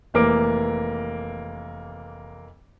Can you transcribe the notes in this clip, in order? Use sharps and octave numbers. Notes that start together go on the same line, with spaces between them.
F1 E3 A#3 A#4 D6 D7